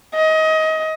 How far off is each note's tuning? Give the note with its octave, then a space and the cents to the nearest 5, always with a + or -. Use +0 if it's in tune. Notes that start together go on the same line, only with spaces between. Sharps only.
D#5 +25